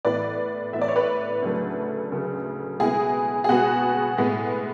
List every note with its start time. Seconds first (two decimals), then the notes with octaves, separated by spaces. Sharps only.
0.05 A2 E3 B3 B4 D5
0.73 A2 E3 B3 E5
0.81 D5
0.88 C#5
0.96 B4 D5
1.42 D2 C#3 F#3 A3
2.11 D2 C#3 F#3 A3
2.80 B2 G#3 B3 E4 G#4
3.44 G#4
3.49 B2 G#3 B3 F#4
4.18 A2 G#3 B3